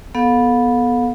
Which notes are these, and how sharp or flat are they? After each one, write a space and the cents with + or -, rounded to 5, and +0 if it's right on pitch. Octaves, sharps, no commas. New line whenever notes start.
B3 -10 A4 -10 F5 +40